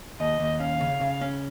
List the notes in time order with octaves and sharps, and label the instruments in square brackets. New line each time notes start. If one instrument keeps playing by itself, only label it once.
[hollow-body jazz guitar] D#2 [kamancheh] D#5
[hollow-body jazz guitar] D#2
[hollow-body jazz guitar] C#4 [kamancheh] F5
[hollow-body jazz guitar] C#3
C#3
C#4